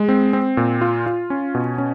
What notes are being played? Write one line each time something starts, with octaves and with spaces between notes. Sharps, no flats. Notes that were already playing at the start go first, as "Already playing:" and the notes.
Already playing: G#3
C4
C4
A#2
F4
F4
C#4
B2
C#4